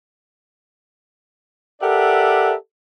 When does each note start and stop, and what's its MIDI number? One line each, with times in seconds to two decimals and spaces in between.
1.81 2.53 67
1.81 2.53 69
1.81 2.53 70
1.81 2.53 74
1.81 2.53 76
1.81 2.53 78